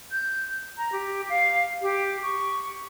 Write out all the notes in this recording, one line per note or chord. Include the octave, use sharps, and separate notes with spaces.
G6
A#5
G4
F5
G4
C#6